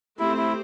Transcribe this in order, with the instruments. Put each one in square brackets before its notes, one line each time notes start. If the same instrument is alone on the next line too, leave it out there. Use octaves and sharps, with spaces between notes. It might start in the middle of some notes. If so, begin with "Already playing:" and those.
[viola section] A3 C4 G4 C5 [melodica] E4
[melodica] E4